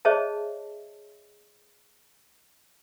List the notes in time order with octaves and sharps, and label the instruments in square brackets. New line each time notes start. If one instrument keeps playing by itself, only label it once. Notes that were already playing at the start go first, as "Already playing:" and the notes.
[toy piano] G#4 C5 C#5 D#5 E5 A5